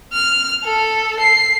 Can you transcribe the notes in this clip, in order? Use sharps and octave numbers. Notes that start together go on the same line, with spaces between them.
F6
A4
C7